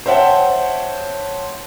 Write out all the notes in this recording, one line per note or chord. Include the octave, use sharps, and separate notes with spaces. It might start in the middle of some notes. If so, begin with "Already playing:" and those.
C5 C#5 E5 F#5 G5 A5